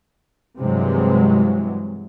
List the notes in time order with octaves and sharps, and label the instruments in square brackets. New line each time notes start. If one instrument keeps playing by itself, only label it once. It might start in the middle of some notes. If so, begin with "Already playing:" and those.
[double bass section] G2 C3 E3 F#3 G#3